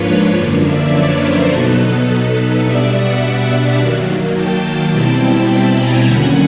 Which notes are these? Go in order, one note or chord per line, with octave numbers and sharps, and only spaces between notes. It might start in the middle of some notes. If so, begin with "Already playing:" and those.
Already playing: G#2 F3 A#3 D4 F4 B4 C#5
F#2 D3 F3 A#3 D4
D5 E5
B4 C#5
A#4 C5
B2 F#3 B3 D#4 A4 B4
B2 G3 B3 D4 D5 E5
E5 F#5
D#3 F#3 A#3
G5 A5
B2 G3 C4 E4
A5 B5
G#5 A#5
D#2 D3 F#3 A#3 C#4 F#5 G#5